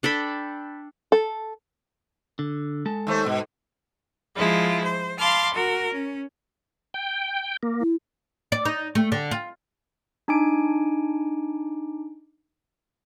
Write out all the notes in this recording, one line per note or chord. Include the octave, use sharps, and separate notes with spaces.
D4 A4 G5 B5
A4
D3
G#3 A4 A5
D#2 A3 C5
G#2 B2
F3 G#3 E4 F4
C5
F5 A5 B5 C6 D6 F6
F#4 A#4
C#4
G5
A#3
E4
D5
D#4
A3
D3
F4
D4 D#4 G#5 D6 D7